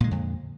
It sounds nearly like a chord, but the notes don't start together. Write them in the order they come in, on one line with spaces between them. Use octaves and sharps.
A#2 G#3 D3 F2